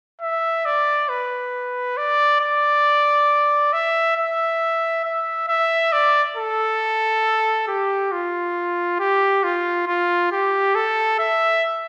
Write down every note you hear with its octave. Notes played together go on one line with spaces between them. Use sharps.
E5
D5
B4
D5
D5
E5
E5
E5
E5
D5
A4
G4
F4
G4
F4
F4
G4
A4
E5